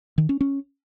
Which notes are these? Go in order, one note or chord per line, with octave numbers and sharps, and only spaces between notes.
D#3
C#4
C#4